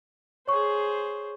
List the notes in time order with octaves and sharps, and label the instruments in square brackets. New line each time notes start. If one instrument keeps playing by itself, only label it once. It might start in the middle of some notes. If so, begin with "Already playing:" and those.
[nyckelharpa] G#4 C5 [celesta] C#5 C#6